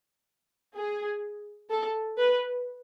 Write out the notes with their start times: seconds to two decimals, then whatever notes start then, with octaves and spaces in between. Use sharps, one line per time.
0.76 G#4
1.71 A4
2.18 B4